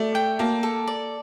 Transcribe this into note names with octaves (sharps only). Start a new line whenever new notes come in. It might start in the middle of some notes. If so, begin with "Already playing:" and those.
Already playing: A3 D5
G5
A#3 A4
A4
D5